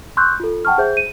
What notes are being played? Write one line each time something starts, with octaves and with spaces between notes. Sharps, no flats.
C6 C#6 E6 F#6 G6
F4 A4
F#5 G5 A5 C#6 F6
G#4 C5 E5 G6
D#7